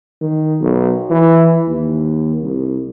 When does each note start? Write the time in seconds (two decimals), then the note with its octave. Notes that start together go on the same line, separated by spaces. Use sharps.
0.21 D#3
0.60 B1
1.10 E3
1.67 D#2
2.42 C2